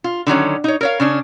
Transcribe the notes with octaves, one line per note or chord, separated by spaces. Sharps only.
F4
D3 D#3 F#3 C#4
D#4 C#5
A#4 C#5 F5
C#3 C#4 D4